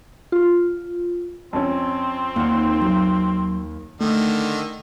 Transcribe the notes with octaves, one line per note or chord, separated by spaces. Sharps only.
F4
F2 C4 C#4
D#2 A#3 F#5
F#3
D3 D#3 A3